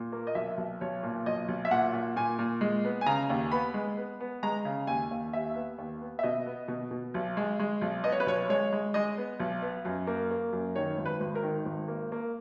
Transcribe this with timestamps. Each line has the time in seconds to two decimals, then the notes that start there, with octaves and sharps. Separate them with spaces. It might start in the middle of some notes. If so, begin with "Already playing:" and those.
Already playing: A#2
0.12 A#3
0.27 D#5
0.35 B1 E5
0.57 B1
0.81 B1 C#5
1.03 A#2
1.26 B1 D#5
1.48 B1
1.65 E5
1.71 A#2 F#5
1.93 A#2
2.16 A#2 G#5
2.39 A#2
2.61 G#3
2.84 B3
3.01 G#5
3.06 C#3 A#5
3.29 D#2
3.51 B3 B5
3.74 G#3
3.97 B3
4.20 B3
4.43 G#3 A#5
4.65 C#3
4.87 D#2 G#5
5.11 D#2
5.33 D#2 E5
5.55 B3
5.78 D#2
6.01 B3
6.19 E5
6.23 B2 D#5
6.46 B3
6.68 B2
6.91 B2
7.14 B1
7.37 G#3
7.60 G#3
7.81 B1
8.04 B3 D#5
8.12 C#5
8.20 B4
8.27 B1 C#5
8.49 G#3 C#5
8.73 G#3
8.94 G#3 D#5
9.17 B3
9.40 B1
9.62 B3
9.85 F#2
10.07 A#3
10.31 A#3
10.53 F#2
10.76 D#3 C#5
10.98 G#1
11.06 B4
11.20 G#1
11.35 A#4
11.43 D#3
11.65 G#1
11.88 A#3
12.12 A#3